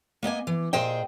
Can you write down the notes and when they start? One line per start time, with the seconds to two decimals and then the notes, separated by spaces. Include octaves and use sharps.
0.23 A#3 B3 D#5 G#5
0.47 E3
0.73 A#2 G#4 C5 D#5 G5